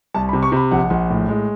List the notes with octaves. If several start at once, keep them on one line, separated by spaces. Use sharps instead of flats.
C2 A5
B5
C3
C#6
C3 B5
A#1 F#5
A#1
A2
G#3